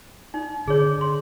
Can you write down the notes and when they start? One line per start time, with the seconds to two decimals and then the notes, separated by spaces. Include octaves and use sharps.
0.34 D#4
0.68 D3 G#4 C#5
1.01 C6